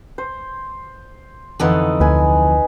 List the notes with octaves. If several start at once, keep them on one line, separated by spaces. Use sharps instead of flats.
C5
F2 D3 E3 B3 D#4 A4
D2 B4 G#5